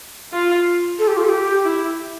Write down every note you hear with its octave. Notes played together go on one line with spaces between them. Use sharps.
F4
A4
G4
F4
A4
G4
E4